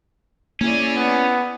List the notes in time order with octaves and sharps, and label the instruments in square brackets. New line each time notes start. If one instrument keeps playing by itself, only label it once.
[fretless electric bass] A#3 [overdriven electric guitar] C#4 [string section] E4 G#4 D5
[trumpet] B3